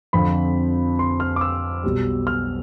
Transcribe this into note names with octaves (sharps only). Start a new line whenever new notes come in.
F2 D3 F3 C4 B5
C6
F6
D6
E6
B1 B2 G3
F6